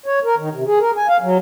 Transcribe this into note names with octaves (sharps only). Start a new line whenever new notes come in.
C#5
A#4
D#3
C3
G#4
A#4
G#5
F5
F#3